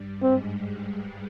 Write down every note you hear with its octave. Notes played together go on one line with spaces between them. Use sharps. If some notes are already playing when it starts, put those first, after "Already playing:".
Already playing: G2 G3
G#2 G#3 C4